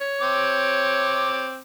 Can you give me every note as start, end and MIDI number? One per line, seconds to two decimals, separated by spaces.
0.01 1.48 73
0.21 1.61 60
0.21 1.61 86